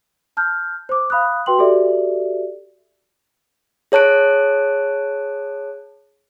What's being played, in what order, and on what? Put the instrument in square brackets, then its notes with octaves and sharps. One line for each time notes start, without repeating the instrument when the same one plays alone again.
[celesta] A5 F6 G6
C5 D6
F5 B5 D#6 F#6
F#4 B4 G5 C6 F#7
F#4 G4 A4 D5 E5
[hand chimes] G#4 C#5 A5 F#6 D7